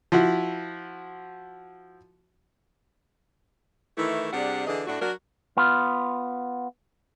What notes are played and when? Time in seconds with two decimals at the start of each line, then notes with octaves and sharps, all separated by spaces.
0.12 F3 E4 F#4
3.97 D#3 E3 A3 E4
4.33 C3 G3 D4 G#4 F#5
4.67 D3 E3 G#4 D5 D#5
4.87 A2 A3 D4 F#4
5.01 F#3 D4 F#4 A#4
5.57 B3 F4